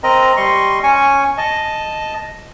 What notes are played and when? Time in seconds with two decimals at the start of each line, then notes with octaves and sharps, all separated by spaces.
0.03 C4 A#4 D#5 A#5
0.37 G3 D#5 C6 C#6
0.83 C#4 G#5 C#6
1.38 D#5 A5